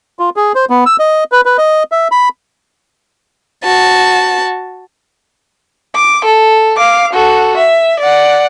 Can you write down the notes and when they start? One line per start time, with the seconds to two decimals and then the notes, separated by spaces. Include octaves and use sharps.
0.19 F4
0.36 G#4
0.55 C5
0.70 B3
0.86 E6
1.00 D#5
1.32 B4
1.45 B4
1.58 D#5
1.92 E5
2.12 B5
3.64 F#4 A5
5.95 D6
6.25 A4
6.77 F5 D6
7.13 F#4 A4
7.57 E5
8.00 D5 F#5